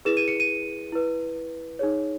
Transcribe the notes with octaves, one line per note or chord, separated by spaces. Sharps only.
E4 G#4 B4 E7
D#7
C#7
D#7
E4 B4
D#4 G#4 C#5